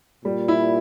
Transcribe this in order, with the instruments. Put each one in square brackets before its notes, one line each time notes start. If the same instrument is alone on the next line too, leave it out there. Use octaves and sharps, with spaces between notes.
[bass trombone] A#2 [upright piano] G3
[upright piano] E4